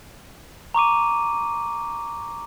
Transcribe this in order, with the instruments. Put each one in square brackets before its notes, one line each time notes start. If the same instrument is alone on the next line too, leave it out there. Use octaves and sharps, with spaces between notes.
[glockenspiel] A#5 C#6 D6 D#7